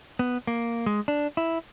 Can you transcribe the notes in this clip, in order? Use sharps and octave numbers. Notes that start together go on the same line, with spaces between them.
B3
A#3
G#3
D4
E4